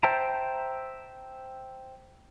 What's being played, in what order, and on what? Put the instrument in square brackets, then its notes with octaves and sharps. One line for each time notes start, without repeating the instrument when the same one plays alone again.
[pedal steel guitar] C5 E5 G5 A5 A#5